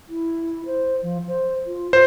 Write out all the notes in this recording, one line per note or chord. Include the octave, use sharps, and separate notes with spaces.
E4
C5
F3
C5
F4
F4 C5